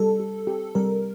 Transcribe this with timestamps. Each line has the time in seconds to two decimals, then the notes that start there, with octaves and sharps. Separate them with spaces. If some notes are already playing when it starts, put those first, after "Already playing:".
Already playing: G3 A4
0.20 G4
0.47 G4
0.75 G3 A#4